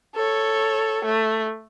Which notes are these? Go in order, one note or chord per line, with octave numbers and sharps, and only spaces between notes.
A4 C#5
A3